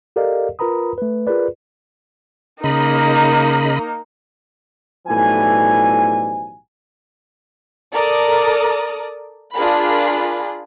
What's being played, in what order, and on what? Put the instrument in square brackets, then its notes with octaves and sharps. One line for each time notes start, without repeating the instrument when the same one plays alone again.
[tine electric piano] G4 A4 A#4 D5 D#5 F5
F4 A#4 B4 A#5 B5 D#6
A3 B4
F4 G#4 A#4 B4 D5
[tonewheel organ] C#3 D#5 B5 [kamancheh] A#3 D#4
[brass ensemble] B1 A2 E3 F3 G3 G#5
[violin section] A4 A#4 D5 D#6
D4 F4 G#4 A#4 B5